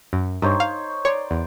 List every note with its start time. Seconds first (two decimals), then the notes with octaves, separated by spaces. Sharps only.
0.13 F#2
0.42 G2 D#4 C5 C#5
0.60 F5
1.05 C#5 D5 C6
1.31 E2